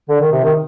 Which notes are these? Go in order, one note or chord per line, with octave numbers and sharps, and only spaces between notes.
D3
D#3
C3
D#3